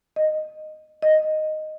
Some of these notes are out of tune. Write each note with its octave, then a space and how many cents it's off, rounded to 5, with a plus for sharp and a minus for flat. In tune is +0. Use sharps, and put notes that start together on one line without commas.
D#5 -10
D#5 -5